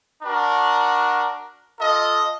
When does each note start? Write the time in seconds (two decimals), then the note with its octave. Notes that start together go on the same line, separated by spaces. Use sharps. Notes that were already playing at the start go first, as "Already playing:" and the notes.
0.23 D4 F#4 A#4
1.78 F4 A4 D#5